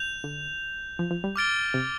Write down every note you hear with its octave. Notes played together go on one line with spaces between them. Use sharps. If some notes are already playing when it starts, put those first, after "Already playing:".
Already playing: G6 F7
D3
F3
F3
G3
D6 F6 A6 D7 G7
C3